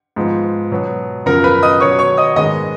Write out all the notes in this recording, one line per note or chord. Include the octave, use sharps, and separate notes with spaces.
G#2 F3 B3
B2 F#3 B3
F#2 C#3 F3 B3 A#4 A#5
B4 B5
D#5 D#6
B2 F#3 B3 C#5 C#6
C#5 C#6
D#5 D#6
G#2 D#3 G#3 B3 D#5 D#6